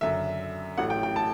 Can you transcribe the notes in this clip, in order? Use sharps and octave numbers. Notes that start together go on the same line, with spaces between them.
F#1 F#2 D3 E5
A1 A2 F#3 A3 F#5
G5
G5
A5